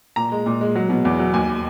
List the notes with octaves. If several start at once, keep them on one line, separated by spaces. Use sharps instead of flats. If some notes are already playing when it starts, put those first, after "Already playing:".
A#2 A#5
G#3
A#2
G#3
F#3
B2
E2
F#3
D#2 G#5